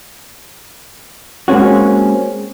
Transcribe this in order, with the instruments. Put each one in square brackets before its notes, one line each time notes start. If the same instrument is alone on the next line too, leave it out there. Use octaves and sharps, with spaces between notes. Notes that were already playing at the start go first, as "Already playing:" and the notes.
[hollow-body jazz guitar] G#3 A#3 C4 C#4 F#4